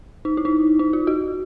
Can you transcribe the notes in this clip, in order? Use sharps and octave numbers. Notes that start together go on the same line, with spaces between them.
D#4
E4
D#4
D#4
F4
F#4